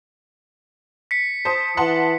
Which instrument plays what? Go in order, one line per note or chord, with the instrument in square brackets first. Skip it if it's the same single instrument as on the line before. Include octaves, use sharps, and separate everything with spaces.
[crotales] B6 C#7
[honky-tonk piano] C5 A5 D#6
[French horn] E3 [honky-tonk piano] F#5 A5 C6